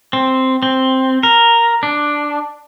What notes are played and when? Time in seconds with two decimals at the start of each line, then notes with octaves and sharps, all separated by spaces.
0.13 C4
0.63 C4
1.23 A#4
1.83 D4